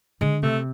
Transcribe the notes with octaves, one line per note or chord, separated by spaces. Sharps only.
D3 G#3
C3 A3